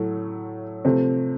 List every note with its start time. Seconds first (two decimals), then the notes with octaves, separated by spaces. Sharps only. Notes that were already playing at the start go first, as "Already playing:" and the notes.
Already playing: A2 F#3 A3
0.85 C3 F3 A3 C4